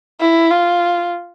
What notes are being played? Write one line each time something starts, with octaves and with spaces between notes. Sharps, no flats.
E4
F4